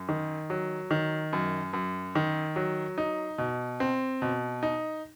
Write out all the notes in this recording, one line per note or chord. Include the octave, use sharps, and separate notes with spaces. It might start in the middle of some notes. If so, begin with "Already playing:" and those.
Already playing: F#2
D#3
F#3
D#3
F#2
F#2
D#3
F#3
D#4
B2
C4
B2
D#4